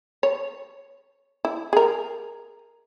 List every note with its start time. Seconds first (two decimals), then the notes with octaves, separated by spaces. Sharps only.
0.23 C#5
1.45 E4
1.73 G#4 A#4